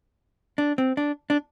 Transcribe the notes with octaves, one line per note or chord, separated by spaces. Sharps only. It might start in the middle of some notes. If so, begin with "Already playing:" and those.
D4
C4
D4
D4